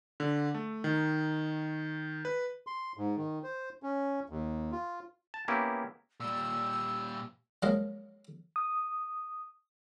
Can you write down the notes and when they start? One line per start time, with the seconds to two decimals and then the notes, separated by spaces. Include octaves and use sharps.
0.20 D3
0.54 A3
0.84 D#3
2.25 B4
2.67 C6
2.97 G#2
3.17 D#3
3.44 C5
3.83 C#4
4.29 D#2
4.72 F4
5.34 A5
5.48 A#3 B3 C#4 E4 G4
6.20 A#2 G3 E6
7.62 F3 F#3 G#3 A#3 D#5 F5
8.56 D#6